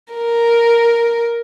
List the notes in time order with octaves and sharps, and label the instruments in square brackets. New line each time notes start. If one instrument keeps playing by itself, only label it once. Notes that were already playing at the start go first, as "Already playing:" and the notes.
[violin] A#4